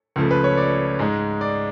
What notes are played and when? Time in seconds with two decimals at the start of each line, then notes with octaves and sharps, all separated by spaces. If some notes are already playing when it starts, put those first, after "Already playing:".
0.16 C#2 C#3 F3 A3
0.31 B4
0.44 C#5
0.57 D5
0.99 G#2 G#3
1.41 D5